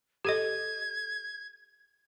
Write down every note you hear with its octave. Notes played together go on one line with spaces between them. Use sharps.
G4 A4 D#5 G#6